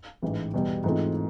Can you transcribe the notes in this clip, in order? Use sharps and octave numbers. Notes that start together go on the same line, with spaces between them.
A1 G#2 E3
E2 B2 G3
G#2 E3 A3 C4 F4